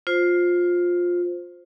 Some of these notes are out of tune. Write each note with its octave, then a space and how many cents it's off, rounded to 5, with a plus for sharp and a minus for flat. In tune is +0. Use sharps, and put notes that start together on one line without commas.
F4 +15 C5 +0